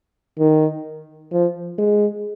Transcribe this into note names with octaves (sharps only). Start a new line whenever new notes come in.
D#3
F3
G#3